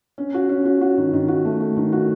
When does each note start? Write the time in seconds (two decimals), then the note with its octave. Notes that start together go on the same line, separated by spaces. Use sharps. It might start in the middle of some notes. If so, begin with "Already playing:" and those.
0.18 C#4
0.34 F#4
0.49 C#4
0.65 F#4
0.81 F#4
0.97 D#3
1.13 D#3
1.28 F#4
1.45 A3
1.60 A3
1.77 D#3
1.92 F#4